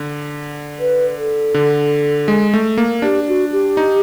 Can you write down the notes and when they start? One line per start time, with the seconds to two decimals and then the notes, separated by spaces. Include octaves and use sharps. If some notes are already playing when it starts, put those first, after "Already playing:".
Already playing: D3
0.80 B4
1.16 A4
1.54 D3
2.28 G#3
2.54 A3
2.78 A#3
3.02 D4 G4
3.28 F#4
3.52 G4
3.77 D#4